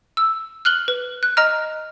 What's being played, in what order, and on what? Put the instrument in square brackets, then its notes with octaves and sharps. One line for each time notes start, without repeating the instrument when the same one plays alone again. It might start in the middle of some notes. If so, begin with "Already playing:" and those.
[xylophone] E6
F6 F#6 F#7 G7
B4
F#6
D#5 A#5 F6